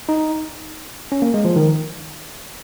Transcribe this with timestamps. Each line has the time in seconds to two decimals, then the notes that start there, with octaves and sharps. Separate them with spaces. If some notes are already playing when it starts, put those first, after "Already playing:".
0.09 D#4
1.12 C#4
1.22 A#3
1.34 G#3
1.45 F3
1.56 D#3